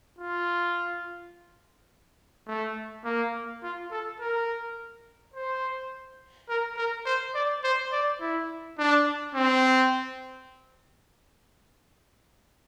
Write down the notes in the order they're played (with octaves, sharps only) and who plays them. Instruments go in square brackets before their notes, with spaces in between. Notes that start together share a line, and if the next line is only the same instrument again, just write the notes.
[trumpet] F4
A3
A#3
F4
A4
A#4
C5
A#4
A#4
C5
D5
C5
D5
E4
D4
C4